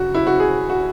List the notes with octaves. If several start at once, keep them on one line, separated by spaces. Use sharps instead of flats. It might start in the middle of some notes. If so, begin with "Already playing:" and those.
Already playing: C#3 F#3 F#4
E4
F#4
G#4
F#4